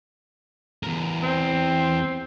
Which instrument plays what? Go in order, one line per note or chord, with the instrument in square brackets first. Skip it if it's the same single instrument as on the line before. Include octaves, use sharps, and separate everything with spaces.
[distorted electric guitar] E2 A#4
[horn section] C4